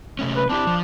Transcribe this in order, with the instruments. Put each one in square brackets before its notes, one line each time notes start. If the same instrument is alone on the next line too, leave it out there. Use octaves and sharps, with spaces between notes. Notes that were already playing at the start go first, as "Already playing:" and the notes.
[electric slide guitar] C3 A3 C#4
[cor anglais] B4
[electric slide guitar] C4 E4 G4 [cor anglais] D4
[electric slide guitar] F3